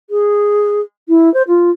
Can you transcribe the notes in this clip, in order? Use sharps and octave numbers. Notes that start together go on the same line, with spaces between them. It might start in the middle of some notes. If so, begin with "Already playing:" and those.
G#4
E4
C5
F4